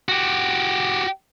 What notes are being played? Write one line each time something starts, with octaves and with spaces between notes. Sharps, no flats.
F#4 G4